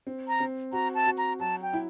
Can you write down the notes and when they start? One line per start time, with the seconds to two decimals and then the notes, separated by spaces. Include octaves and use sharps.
0.07 C4
0.28 A#5
0.40 C4
0.73 F#4 A#5
0.95 A5
1.06 F#4
1.18 A#5
1.40 F#3 A5
1.62 G5
1.73 E4